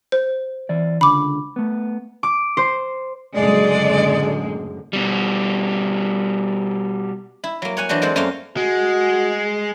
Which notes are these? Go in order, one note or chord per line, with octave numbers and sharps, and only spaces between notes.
C5
E3 D5
C#2 D3 B5 D6
A3 B3
D6
C5
F#1 A2 D3 G#3 D5
B2 G3
E4
F#3 A#3
C#5 F#5 G#5
E3 F#3 D4 F#4 C5
G#3 A#3 C4 A4 C5 F#5
F#2 A3 A#3 F#4 F5 C6
G#3 F#4